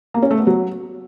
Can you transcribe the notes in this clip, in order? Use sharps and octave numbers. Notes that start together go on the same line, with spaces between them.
A#3
C#4
A3
B3
F#3